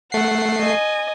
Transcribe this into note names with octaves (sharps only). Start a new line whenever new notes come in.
A3 F#5 C7
D#5 G#5